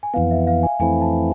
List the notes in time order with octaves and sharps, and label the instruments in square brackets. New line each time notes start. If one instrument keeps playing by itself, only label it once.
[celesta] G#5
[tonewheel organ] F2 E3 B3 [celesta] F5
[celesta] E5
F5
G#5
[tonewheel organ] F2 E3 A3 C4 E4 [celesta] G#5
[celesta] A5